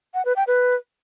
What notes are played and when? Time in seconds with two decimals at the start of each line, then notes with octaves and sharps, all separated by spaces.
0.14 F#5
0.25 B4
0.36 G5
0.47 B4